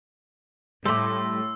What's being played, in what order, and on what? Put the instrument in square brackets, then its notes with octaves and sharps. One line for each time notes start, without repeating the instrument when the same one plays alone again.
[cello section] A2 [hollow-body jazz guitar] G3 A3 [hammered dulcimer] C6 D6 [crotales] E6